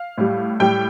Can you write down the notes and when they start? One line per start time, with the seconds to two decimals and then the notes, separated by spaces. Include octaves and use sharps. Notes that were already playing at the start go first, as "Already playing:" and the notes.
Already playing: F5
0.18 A2 G3
0.60 A2 G3 G5